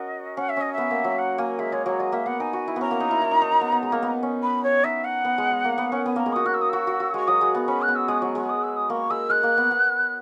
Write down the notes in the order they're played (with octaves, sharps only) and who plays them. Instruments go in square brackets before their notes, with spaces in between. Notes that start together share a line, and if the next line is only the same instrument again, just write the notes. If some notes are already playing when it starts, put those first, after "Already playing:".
Already playing: [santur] C#4 F#4 A#4 [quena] D#5
[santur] C#4 [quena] F#5
[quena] E5
[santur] C#4 [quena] D#5
[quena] E5
[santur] B3
A#3
F#3
[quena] F#5
[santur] A#3 [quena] G#5
[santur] G#3 [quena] E5
[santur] G#3 [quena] C#5
[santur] F#3 [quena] C#5
[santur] G#3 [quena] D#5
[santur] A#3 [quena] E5
[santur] B3 [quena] F#5
[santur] D#4 [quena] G#5
[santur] F#4
E4
[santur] B3 C#4 [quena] A#5
[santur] A#3
D#4
E4
E4
D#4
D#4
D#4
B3
B3
G#3
A#3
B3
C#4
[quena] B5
C#5
[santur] D#4 [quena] E5
[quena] F#5
[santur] B3
G#3
G#3
A#3
B3
C#4
[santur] B3 [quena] G#5
[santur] A#3 [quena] A#5
[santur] G#3
[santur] F#4 [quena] D#6
[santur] F#4 [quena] F#6
[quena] E6
D#6
[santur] F#4 [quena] E6
[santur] F#4
F#4
[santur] G#3 [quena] C#6
[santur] F#3 [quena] D#6
[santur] G#3
B3
[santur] C#4 [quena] B5
[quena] F#6
[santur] B3
[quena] E6
[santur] G#3 [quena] D#6
[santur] F#3 [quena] C#6
[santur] G#3 [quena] C#6
[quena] D#6
E6
D#6
[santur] A#3 [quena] C#6
[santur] G#3 [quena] E6
[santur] G#3 [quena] F#6
[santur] A#3
B3
B3